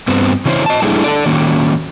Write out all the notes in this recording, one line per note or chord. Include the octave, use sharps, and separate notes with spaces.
G2 B3 C4
C#3 E3 C#4 E4 C5 C#5
D#5 A5
G3 A3 A#3 D4 E4 G#4
D4 A4 D5
D#3 F#3 A#3 C#4